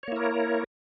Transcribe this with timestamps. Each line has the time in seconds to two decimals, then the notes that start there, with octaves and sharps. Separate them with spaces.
0.03 C#5
0.08 A#3
0.12 E4
0.16 A#4